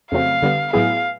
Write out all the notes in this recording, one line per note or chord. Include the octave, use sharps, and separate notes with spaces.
F2 C#3 F#3 A3 C4 F5
D3 G3 B3
A2 F#3 B3 E4 G#4 F5